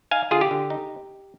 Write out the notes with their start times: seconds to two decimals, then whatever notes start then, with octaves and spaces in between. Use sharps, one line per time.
0.11 D#4 F5 G#5
0.31 D3 F4 G#4
0.41 G4
0.51 D3
0.70 D#4